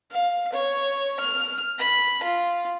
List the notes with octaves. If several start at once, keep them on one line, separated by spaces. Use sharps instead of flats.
F5
C#5
F6
B5
F4